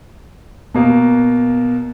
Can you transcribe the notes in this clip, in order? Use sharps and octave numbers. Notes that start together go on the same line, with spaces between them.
B2 A#3